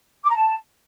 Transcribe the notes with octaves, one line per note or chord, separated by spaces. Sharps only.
D6
A#5
A5